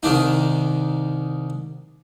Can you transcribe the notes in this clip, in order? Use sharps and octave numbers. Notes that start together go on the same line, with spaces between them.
C2 D#3 D4 D#4